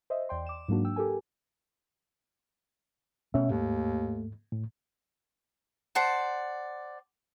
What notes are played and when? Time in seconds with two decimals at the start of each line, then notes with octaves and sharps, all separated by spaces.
0.10 C5 D#5 E5
0.29 E2 D5 G5 C6
0.46 D6 E7
0.68 G#2 F#3 A#3 D4 F#4
0.85 G5 E6
0.96 G4 A4 A#4 G#5
3.34 B2 A3 C#4 E5
3.50 D#2 G#2 A3
4.52 A2
5.95 C5 D5 F#5 A5